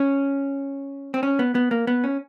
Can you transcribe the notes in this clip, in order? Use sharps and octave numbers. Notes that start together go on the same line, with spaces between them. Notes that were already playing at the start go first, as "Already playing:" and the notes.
Already playing: C#4
C4
C#4
B3
B3
A#3
B3
C#4